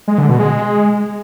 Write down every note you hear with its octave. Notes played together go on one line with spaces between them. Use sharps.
G#3
D3
B2
G#3